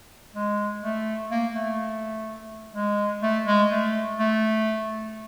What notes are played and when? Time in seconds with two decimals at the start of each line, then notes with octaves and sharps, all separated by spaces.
0.35 G#3
0.83 A3
1.31 A#3
1.55 A3
2.74 G#3
3.22 A3
3.47 G#3
3.70 A3
4.19 A3